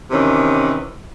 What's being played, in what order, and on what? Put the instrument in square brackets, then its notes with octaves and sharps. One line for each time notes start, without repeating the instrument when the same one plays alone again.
[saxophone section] C3 D#3 E3 C#4